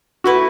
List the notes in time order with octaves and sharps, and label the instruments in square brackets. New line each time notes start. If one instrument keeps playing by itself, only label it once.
[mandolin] A3 E4 B4 [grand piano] F#4